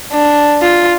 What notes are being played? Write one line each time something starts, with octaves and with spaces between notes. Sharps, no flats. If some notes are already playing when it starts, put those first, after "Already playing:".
D4
F4